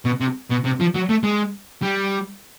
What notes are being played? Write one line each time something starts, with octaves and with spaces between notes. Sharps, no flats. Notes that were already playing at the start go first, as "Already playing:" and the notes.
B2
C3
B2
C3
F3
F#3
A3
G#3
G3